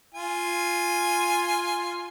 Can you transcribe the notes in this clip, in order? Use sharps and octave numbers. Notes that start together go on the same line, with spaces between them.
F4 G#5